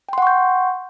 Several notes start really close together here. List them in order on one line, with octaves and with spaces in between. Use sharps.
G5 C6 F#5 C#6 G6